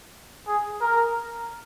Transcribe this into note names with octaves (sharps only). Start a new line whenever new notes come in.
G#4
A#4